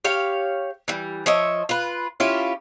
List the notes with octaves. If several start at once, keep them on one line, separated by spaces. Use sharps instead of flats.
G4 C#5 F5
E3 G3
F3 C#5 D#5 E5
F4 B4
C#4 E4 F4 G4